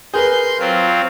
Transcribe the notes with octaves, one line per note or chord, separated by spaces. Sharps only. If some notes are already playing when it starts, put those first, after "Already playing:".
G#4 A#4 B4 C6 G6
F#3 C4 F4